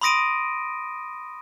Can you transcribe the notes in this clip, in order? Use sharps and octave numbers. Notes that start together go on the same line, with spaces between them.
B5 C6 D#6 A#6 D7 D#7